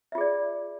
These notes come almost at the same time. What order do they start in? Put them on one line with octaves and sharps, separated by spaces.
E5 F4 G#4 D5